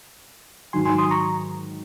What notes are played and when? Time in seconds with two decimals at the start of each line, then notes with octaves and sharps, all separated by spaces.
0.73 G#2 D#3 F#3 G#5 C6
0.85 G#5 C6
0.98 C6 D#6
1.11 A#5 C#6